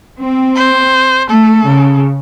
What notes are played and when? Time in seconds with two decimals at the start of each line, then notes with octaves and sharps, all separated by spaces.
0.19 C4
0.56 C5
1.29 A3 A4
1.67 C#3